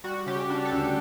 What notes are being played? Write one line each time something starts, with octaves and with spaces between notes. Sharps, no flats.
G3 F#4
C#3 G4
G3 D4
A4
D2